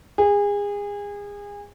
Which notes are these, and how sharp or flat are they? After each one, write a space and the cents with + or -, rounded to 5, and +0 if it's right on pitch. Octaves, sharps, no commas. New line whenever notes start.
G#4 -30